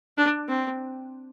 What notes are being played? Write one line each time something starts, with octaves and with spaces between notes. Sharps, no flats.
D4
C4